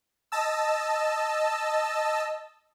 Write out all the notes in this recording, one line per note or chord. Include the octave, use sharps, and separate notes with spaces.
D#5 A5 E6